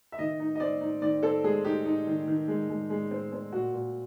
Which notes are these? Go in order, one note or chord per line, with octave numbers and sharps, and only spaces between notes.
E5
D#3 D#5
D#4
D#5
C4 D5
D#4
D#3 D5
C4 A4
G#3 G#4
D#4 G4
D#4
D#3
D#3
G#3
G#3
G#3
C4
C4
A#2 F#4
A#2